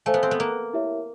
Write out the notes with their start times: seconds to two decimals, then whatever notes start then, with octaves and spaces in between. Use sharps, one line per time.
0.06 A3 A4 C5 F5 G#5
0.14 B3
0.23 C4
0.31 B3
0.40 A#3
0.73 E4 G4 A#4 C#5 E5